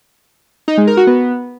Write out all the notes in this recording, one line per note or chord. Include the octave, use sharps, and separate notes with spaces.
D#4
G#3
A#4
F#4
B3